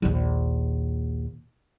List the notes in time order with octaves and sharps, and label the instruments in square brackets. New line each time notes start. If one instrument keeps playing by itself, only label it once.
[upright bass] A#1 D#2